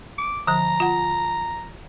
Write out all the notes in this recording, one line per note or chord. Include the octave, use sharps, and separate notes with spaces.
D6
D3 F3 A#5
F4 F#5